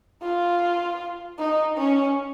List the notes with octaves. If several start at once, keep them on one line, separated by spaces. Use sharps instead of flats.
F4
D#4
C#4